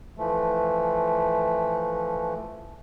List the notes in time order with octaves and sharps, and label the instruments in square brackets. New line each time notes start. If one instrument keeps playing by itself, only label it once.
[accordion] E3 F3 A3